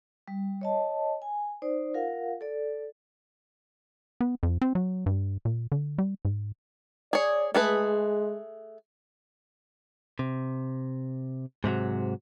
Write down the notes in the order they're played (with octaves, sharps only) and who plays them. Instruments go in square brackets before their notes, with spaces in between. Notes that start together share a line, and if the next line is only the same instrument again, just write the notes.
[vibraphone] G3
C#5 D#5 A5
G#5
D#4 C5 D5
F4 A#4 F5 F#5
A4 D5
[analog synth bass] B3
F2
C4
F#3
G2
A#2
D3
G3
G#2
[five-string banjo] G#4 C#5 [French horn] D5
[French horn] G#3 [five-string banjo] A3 G#4 B4
[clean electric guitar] C3
G#2 C3 F3 F#3